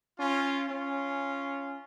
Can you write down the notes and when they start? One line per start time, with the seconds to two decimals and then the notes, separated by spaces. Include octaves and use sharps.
0.19 C#4 F4
0.69 C#4 F4